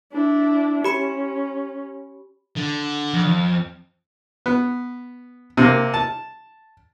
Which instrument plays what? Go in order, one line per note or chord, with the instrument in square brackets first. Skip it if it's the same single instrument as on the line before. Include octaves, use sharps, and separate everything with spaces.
[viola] D4 E4
[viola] C#4 [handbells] G4 B5 C#7
[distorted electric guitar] D3
[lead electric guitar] F2
[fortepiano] B3
C3 A#3
A5